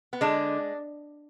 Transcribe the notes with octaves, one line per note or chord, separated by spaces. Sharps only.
B3
D3 G#3 D4